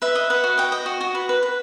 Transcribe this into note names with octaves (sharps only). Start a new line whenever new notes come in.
B4 E5
D#5
B4 F#5
F#4
D#5 G5
D#5
F#4
F#4
B4
B4
B4